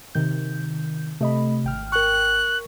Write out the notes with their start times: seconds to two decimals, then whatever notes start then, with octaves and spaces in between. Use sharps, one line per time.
0.15 C3 D#3 G6
1.21 C3 A3 D#5 B5
1.64 G#1 G5 F6
1.92 A#4 C#6 F#6